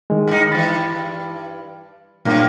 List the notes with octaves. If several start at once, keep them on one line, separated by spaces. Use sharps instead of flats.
D#3 G#3
G#2 D#4
G2 E3 B5 A6
F#2 A#2 A#3